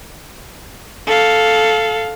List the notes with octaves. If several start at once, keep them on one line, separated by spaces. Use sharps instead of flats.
A4 F5